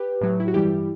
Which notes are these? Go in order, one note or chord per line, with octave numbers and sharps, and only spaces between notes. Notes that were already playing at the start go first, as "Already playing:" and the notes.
Already playing: G4 B4
A2 F#3
E4
F#4
G2 E3 G3 E4 G4